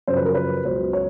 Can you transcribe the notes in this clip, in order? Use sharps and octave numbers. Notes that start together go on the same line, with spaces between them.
F#2 C#3 F3 C5
B4
A#4
B4
C#2 B2 F#3 C5
C#5